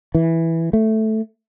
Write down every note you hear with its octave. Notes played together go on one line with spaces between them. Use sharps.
E3
A3